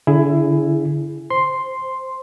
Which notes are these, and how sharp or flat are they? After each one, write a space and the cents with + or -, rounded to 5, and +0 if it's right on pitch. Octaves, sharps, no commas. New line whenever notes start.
D3 -30 E4 +15 G#4 +0
C5 +0 C6 +0